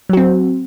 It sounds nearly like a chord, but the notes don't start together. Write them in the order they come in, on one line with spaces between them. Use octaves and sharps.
F#3 F#4 C4